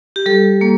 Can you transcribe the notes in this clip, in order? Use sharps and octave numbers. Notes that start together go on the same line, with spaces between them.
G4
G3 A4
A#3